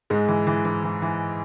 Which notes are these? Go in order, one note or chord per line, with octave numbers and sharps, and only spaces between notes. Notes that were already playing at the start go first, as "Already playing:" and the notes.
G#2 G#3
E3
E3
E3
E3
E3